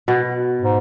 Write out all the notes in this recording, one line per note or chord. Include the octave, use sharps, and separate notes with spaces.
B2
G#2